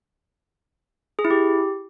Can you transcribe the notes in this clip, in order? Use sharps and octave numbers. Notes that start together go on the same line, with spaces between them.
G#4
E4
G4